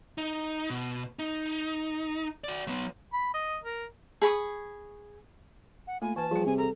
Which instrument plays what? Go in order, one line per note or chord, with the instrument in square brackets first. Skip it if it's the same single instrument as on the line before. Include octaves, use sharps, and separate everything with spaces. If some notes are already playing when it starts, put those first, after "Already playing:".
[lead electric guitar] D#4
B2
D#4
F#4 D5
F#3 B3
[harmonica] B5
D#5
A#4
[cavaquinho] G#4 B5 C#6 D#6
[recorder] F#5
[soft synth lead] A3 [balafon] A#3 F4 [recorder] G#5
[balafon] E3 B4 [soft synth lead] G#5 [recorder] A5
[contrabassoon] F3 [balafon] G3 G5 [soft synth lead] G#4
[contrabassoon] C3 [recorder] G#5
[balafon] A4 [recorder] A#5